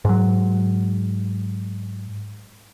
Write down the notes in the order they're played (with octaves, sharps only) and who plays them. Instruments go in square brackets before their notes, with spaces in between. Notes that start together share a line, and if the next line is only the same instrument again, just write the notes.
[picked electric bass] G#2 F#3